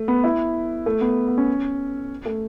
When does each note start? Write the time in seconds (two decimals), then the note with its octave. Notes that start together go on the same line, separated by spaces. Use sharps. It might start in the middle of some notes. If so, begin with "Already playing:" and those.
Already playing: A3
0.08 B3
0.24 E4
0.86 A3
1.01 B3
1.28 B3
1.38 C#4
2.26 A3